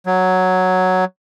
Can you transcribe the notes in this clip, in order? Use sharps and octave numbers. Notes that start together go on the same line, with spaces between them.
F#3